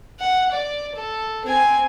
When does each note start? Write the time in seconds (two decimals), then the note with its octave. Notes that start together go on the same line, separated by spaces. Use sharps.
0.20 F#5
0.52 D5
0.95 A4
1.45 C4 G#5